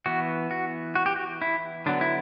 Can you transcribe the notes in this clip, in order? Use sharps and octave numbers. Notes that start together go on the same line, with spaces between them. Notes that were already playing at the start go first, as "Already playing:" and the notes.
E3 B3 F#4
F#4
F#4
G4
F#4
E4
D3 F#3 B3 D4
E4